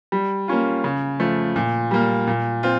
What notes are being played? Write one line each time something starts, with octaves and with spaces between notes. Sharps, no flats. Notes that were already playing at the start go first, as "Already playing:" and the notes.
G3
A#3 C#4 F4
C#3
F3 A3
A#2
G3 A#3
A#2
C4 F4